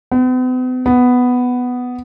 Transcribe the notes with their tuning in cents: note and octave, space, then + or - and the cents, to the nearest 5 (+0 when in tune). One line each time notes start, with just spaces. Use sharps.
B3 +45
B3 +5